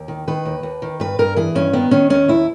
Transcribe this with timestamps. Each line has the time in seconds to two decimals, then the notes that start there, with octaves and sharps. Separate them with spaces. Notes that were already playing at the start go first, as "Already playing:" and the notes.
Already playing: D#2
0.08 D#3
0.28 D#3 B4
0.45 D#2
0.63 D#2
0.82 D#3
1.00 G2 B4
1.19 G2 A#4
1.36 E3 G#4
1.55 G2 C#4
1.73 D#3 B3
1.91 D#3 C#4
2.10 D#2 C#4
2.28 D#2 E4